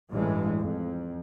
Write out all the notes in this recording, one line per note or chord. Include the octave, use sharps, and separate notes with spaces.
A1 G2 E3 G#3
F2